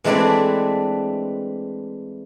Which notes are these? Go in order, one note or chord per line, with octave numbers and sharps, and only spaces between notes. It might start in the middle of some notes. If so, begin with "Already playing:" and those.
E3 G#3 A3 C4 D4 B4